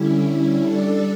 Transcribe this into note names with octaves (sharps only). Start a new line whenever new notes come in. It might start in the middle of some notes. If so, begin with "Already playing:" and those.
Already playing: D3 G3 C#4 E4
G3 D4 A4